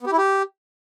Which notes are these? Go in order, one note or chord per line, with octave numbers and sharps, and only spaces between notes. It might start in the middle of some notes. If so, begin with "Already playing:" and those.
B3
G4
E4
G4